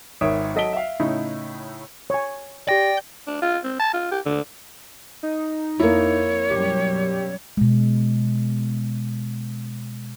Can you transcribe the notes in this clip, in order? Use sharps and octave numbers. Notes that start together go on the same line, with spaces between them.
G#1 D#3 C#5 E5 D#6 D7
F#3 A4 D#5 B6 D7 G7
E5 F5
A2 C#3 D#4 E4
C#5 G#5
G4 D5 G5 A#6
D4
F4
C4
A5
F4
G4
D3
D#4
F2 A#3 E4 C#5
F#2 B2 G3 G4
B2 G#3